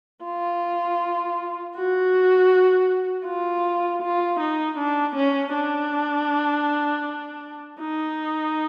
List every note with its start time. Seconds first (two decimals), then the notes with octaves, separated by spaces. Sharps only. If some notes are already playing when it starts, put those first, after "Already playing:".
0.24 F4
1.76 F#4
3.26 F4
4.02 F4
4.40 D#4
4.77 D4
5.15 C#4
5.53 D4
7.80 D#4